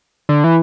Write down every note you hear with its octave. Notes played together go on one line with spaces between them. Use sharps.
D3
E3